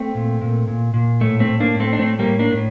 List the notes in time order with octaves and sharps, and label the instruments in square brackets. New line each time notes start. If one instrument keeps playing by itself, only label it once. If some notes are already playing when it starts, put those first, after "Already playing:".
Already playing: [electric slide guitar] A3 C4
A#2
A#2
A#2
A#2
A2 A3
A3 C4
A2
A#3 D4
A2
A3 C4
D4
A2 A3 C4
G3 A#3
A2
A#3 D4
A2